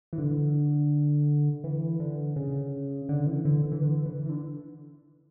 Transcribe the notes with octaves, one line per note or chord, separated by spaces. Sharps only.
E3
D3
E3
D3
C#3
D3
E3
D3
E3
D3
E3
E3
D3